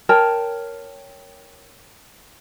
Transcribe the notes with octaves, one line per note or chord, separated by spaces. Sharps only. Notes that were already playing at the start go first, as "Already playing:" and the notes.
A#4 C#5 G5 A5